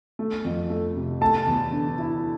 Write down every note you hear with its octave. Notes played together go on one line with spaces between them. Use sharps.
A3
F2
A3
C3
A3 A5
E2
D3
E4